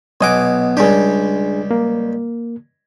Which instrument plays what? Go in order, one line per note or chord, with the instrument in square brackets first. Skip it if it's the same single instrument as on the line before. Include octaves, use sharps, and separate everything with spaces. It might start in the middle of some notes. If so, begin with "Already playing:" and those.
[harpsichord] B1 G#5 D6 [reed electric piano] B3 D#5 F#5
[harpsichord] C#2 G3 G4 [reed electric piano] D4 G#4
[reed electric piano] A#3